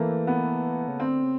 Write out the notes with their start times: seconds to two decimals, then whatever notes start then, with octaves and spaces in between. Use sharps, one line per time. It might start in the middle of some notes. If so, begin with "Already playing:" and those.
Already playing: E3 A3 A#3
0.27 B3
0.88 C#3
0.99 D3 C4
1.23 C#3